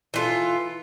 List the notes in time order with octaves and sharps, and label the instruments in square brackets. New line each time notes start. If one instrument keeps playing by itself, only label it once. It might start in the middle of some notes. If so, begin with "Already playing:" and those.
[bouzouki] E3 F4 A4